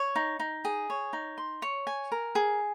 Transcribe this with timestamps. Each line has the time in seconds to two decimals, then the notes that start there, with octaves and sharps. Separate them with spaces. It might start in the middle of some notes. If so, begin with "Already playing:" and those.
Already playing: C#5
0.16 D#4
0.40 D#4
0.65 G#4
0.90 C#5
1.13 D#4
1.38 C6
1.62 C#5
1.87 G#5
2.12 A#4
2.35 G#4